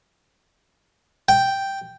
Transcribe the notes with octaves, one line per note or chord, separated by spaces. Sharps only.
G5